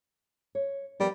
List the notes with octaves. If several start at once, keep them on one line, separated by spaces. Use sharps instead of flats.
C#5
F3 G3 B3 A#4